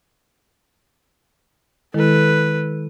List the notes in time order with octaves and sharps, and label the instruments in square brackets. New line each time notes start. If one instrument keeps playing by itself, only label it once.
[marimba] D#3 G#3 E4 [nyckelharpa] A4 B4